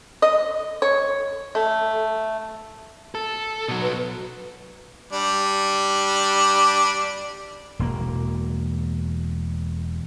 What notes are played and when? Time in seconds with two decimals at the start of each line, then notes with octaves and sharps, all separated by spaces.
0.22 D#5
0.82 C#5
1.55 A3
3.15 A4
3.68 B2 F#3
3.82 B4
5.13 G3 D4
7.79 E1 A#3